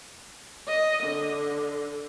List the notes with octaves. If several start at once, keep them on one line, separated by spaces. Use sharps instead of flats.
D#5
D3